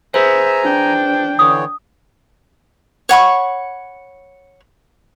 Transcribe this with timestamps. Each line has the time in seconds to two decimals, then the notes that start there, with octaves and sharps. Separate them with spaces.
0.14 G#4 B4 C5 E5 G#5 A#5
0.64 D4 G5
1.39 D3 E3 C#5 D#6
3.09 C#5 F#5 B5 C#6